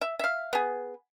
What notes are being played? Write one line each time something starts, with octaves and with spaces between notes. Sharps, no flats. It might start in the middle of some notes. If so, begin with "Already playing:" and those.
E5
E5 F5
B3 G#4